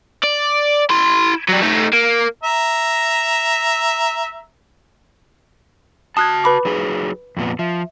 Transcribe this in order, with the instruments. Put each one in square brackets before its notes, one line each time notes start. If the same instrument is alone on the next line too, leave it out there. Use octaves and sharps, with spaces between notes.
[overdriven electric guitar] D5
E4 C6
F#3 G3
A3 D#4
A#3
[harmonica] E5 A#5
[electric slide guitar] F#4 A5 [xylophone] D#6 F#6 G#6
[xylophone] B4 B5 D6
[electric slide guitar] F#3 D#4 G#4
F2 A#2 B3
[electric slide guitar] F3 [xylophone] E5